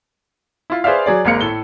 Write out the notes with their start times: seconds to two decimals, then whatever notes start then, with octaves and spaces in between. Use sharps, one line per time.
0.70 E4 F4
0.84 G#4 B4 C5 D5 E5 F5
1.06 F#3 G#4 D5
1.25 G#1 G#3 A#3 F5 C#7
1.41 A2 A4 G7